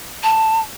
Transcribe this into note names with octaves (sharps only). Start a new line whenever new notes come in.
A5